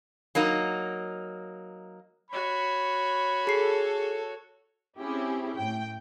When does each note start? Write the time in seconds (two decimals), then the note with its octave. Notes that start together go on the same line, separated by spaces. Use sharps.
0.35 F#3 A#3 D#4
2.31 F#4 C#5 B5
3.47 G#4 A4 C7
4.98 C4 C#4 E4 G4 G#4
5.56 A2 G5